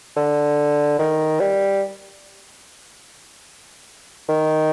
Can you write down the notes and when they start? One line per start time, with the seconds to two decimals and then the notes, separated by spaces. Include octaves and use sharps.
0.17 D3
0.99 D#3
1.40 G3
4.29 D#3